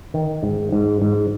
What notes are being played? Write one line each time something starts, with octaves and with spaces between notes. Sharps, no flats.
D#3
G#2
G#2
G#2